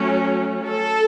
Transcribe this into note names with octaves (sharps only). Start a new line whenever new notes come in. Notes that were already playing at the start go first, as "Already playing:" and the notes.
Already playing: F#3 A3 C#4
A4